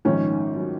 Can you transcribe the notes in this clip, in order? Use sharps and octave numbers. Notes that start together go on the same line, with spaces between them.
A#1 G#2 D#3 C#4
F#3